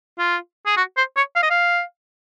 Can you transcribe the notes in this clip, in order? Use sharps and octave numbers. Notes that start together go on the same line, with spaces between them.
F4
G#4
F#4
C5
C#5
F5
D#5
F5